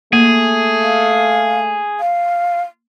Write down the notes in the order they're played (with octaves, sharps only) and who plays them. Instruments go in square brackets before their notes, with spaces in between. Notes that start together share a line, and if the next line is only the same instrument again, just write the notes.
[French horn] A3 [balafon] A#3 [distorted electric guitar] G#4
[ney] F5
F5